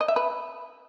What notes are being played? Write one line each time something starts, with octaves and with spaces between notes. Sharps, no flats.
D#5
E5
B4